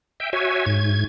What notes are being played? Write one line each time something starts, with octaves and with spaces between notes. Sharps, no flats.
E5 G5
F#4 C#5 E5 G#5
G#2 G#6